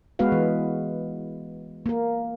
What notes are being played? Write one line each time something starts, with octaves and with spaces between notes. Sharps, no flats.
G#3 B3 F#4 B4 F5
E3
A#3 A#4